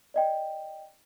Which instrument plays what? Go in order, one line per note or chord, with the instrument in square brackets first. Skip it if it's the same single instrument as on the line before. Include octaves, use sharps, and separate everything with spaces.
[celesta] D5 D#5 G5